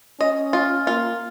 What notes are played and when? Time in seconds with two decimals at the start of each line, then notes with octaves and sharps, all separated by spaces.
0.20 C#4 D#5
0.53 F4
0.86 A#3 F4